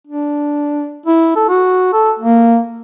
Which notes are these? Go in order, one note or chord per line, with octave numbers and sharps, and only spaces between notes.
D4
E4
A4
F#4
A4
A#3